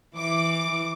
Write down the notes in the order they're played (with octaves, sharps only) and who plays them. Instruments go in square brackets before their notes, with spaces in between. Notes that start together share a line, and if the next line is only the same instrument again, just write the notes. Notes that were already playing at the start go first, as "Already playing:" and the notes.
[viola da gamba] E3 [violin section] D6